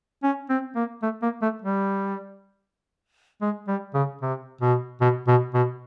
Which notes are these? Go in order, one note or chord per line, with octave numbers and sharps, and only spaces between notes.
C#4
C4
A#3
A3
A#3
A3
G3
G#3
G3
C#3
C3
B2
B2
B2
B2